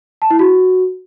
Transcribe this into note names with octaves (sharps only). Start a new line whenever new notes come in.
A5
E4
F#4